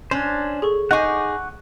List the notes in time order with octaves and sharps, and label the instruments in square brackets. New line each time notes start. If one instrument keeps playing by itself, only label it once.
[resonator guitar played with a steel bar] C#4 [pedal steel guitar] D4 C5
[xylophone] G#4 A4 C#6
[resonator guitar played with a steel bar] D#4 G#4 [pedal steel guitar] F#5 C#6 D6 [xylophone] G6 A#6